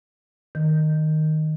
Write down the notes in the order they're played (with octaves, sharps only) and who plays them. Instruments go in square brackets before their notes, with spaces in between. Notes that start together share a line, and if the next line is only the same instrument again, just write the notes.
[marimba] D#3